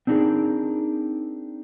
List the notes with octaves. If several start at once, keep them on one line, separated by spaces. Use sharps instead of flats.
C4 D4 D#4 F#4 G#4 A#4